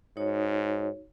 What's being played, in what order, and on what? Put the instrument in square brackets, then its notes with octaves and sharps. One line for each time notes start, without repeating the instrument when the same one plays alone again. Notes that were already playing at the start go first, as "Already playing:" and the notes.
[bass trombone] G#2 [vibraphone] D#4 F#4 C#5